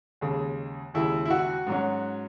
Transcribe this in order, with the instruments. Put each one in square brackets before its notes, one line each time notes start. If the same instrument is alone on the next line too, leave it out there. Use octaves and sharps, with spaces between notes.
[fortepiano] D#2 C#3 G#3
D#2 C#3 G#3 E4
E4
F#4
G#2 F#3 C#4